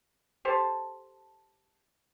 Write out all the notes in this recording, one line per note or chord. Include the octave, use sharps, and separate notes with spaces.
G4 A4 C5 A5